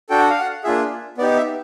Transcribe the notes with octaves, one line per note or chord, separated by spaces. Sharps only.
D4 F#4 A4 G5
F#5
F5
F#5
A#3 D4 F4 G#4 E5
B3 D#4 G4 D5
E5